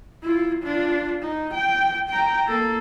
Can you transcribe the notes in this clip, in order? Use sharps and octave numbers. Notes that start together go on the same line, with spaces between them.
E4 F4
D4 F4
D#4
G5
G5 A#5
A#3 A4